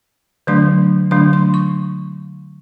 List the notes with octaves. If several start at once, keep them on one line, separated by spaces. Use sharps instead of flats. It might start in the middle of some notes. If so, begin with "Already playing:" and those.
D3 F#3 A3 D4 C6
D3 F#3 A3 D4 C6
C6
C#6